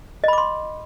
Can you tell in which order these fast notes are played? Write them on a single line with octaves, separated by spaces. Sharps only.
D#5 B5 D6 C6